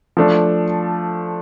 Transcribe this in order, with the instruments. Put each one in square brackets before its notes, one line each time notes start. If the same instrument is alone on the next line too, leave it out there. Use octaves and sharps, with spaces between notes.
[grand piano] F3 A3 D4